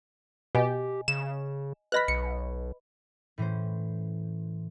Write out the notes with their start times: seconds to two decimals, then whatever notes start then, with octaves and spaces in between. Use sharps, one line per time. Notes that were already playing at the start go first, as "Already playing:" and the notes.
0.55 B2 G4 D#5 G#5
1.08 C#3 E7
1.92 B4 D#5 B5 F#6 A#6 B6
2.08 B1 C#7
3.38 A2 E3 C#4 C5